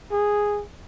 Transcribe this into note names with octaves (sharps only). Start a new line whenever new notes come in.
G#4